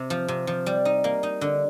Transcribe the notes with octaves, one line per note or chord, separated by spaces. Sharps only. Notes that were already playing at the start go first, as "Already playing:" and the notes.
Already playing: C3
F3
C3
F3
G3
D#4
A#3
D#4
D3